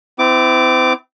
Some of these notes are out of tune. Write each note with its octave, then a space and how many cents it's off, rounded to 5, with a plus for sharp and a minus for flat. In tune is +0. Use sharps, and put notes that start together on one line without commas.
C4 -35 E4 +0 D6 +0